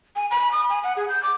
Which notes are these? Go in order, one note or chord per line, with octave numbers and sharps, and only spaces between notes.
G#5
B5
D#6
G#5
F#5
G#4
G6
D6